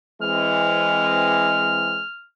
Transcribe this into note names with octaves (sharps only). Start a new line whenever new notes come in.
E3 G#3 C4 F6